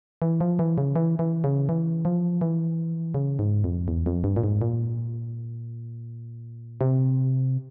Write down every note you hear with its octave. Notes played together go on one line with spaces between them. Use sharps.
E3
F3
E3
C#3
E3
E3
C#3
E3
F3
E3
C#3
G#2
F2
E2
F2
G2
A#2
G#2
A#2
C3